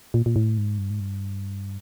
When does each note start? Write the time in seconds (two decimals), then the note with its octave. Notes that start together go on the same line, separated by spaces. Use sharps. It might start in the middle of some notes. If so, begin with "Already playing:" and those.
0.14 A#2
0.26 A#2
0.36 A2
0.58 G#2
0.78 G2
0.90 G#2
1.00 G2